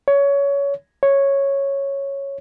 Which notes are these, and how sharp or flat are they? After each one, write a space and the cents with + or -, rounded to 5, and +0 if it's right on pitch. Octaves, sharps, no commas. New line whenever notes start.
C#5 +20
C#5 -5